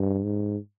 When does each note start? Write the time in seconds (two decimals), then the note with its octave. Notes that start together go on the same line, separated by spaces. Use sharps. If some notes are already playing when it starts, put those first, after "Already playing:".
Already playing: G2
0.24 G#2